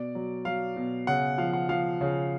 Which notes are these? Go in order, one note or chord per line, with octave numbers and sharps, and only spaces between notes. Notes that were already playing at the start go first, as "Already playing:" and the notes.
Already playing: B2 D5
F#3
F#3 F5
B2
C#3 F#5
F3 F5
F#5
F3 F5
C#3